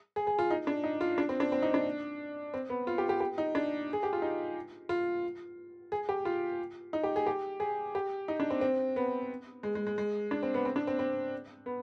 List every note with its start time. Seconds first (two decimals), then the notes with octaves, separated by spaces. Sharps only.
0.16 G#4
0.27 G#4
0.39 F4
0.51 D#4
0.67 D4
0.84 D#4
1.01 F4
1.18 D4
1.29 C4
1.40 D4
1.52 C4
1.62 D#4
1.74 D4
2.54 C4
2.70 B3
2.87 F4
2.98 G4
3.09 G4
3.20 G4
3.38 D#4
3.55 D4
3.93 G#4
4.03 G4
4.13 F4
4.22 D#4
4.89 F4
5.92 G#4
6.09 G4
6.25 F4
6.93 D#4
7.03 G4
7.16 G#4
7.26 G4
7.60 G#4
7.95 G4
8.28 D#4
8.40 D4
8.50 C4
8.61 C4
8.96 B3
9.63 G#3
9.75 G#3
9.87 G#3
9.98 G#3
10.31 D4
10.43 C4
10.54 B3
10.65 C4
10.76 D4
10.87 C4
10.99 C4
11.66 B3